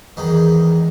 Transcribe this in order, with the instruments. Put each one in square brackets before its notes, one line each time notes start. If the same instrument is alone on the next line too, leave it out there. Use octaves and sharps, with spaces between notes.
[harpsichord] E2 D#3 G#3